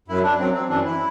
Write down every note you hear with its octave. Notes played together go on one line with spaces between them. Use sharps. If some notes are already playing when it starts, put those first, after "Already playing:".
F#2 F#3 E4
D4
F#2 F#3 C4
C4
F#2 E3 D4
E4